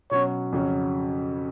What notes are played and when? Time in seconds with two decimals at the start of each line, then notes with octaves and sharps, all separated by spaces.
0.11 B2 F#3 C#4 C#5
0.53 F2 C#3 F#3 C#4